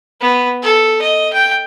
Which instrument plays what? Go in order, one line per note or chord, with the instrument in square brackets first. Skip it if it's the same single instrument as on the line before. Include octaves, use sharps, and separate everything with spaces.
[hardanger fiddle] B3
A4
D#5
G5